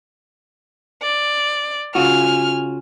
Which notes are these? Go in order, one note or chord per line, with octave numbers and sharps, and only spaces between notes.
D5
C#3 F4 F#4 G#5 F6